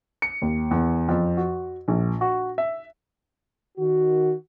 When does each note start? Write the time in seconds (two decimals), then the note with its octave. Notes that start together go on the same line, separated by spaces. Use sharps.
0.22 C#7
0.42 D#2
0.71 E2
1.09 F2
1.37 F#4
1.88 A#1
2.21 F#4
2.58 E5
3.78 D#3 F#4